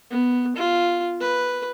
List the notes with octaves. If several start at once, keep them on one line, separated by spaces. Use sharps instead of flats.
B3
F4
B4